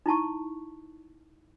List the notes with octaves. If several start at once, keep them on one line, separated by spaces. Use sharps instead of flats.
D#4 E4 A5 C#6